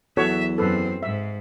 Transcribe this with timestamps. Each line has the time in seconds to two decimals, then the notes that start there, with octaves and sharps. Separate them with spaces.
0.17 E2 F#3 B3 F#4 A4 C#5 E5
0.58 F#2 C4 A4 B4
1.03 G#2 E5